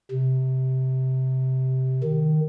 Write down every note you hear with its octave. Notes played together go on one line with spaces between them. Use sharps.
C3
D#3